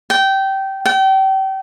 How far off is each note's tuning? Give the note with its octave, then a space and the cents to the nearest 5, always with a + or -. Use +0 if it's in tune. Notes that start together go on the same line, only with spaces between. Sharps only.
G5 -20
G5 -35